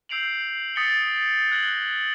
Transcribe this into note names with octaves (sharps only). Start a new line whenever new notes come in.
E6 G6 C7 D7 F7 F#7
D#6 A6 B6 C#7 G7
F#6 G#6 A#6 F#7 G7